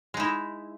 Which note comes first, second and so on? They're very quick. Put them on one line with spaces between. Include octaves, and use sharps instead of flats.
G#3 D#4 E4